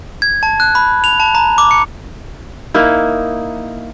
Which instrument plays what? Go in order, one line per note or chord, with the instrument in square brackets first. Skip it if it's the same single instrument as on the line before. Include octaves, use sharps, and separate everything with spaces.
[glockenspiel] G#6
A5
F#6
B5
F7
A5
A#5
D6
C#7
[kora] A#3 D#4 E4